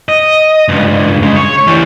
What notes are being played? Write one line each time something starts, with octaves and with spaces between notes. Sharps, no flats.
D#5
C#2 G2
C#3 G#3
C#5
E3 G3